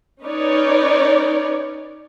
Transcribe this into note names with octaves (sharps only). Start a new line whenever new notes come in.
C#4 D#4 B4 C#5 D5